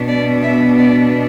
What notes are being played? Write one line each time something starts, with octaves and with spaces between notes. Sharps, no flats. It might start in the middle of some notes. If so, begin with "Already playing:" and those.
Already playing: B2 B3 D4
D5
E5
D5